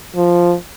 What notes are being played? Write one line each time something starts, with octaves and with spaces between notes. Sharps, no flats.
F3